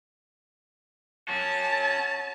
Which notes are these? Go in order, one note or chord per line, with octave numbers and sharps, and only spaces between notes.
C#4 F#4 A5